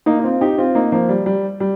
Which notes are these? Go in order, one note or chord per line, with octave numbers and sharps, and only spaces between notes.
A#3 D#4
D#4
C4 F4
D#4 G4
C4 F4
A#3 D#4
F3 A#3
G3
G3
G3